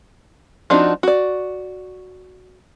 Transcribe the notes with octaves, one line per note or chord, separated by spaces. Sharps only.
F3 C4 D4 D#4 F#4
F#4 D5